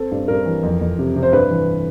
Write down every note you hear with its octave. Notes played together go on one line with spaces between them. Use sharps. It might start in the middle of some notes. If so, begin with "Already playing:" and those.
Already playing: C4 A4
G2
G2 A#4
E3
F2
F2
C3
C3
C5
G2 B4
E3